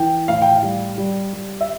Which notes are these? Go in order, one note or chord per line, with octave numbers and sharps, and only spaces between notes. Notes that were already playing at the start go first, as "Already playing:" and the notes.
Already playing: E3 G5
A2 F5
G5
F5
G3
G3
G3
E5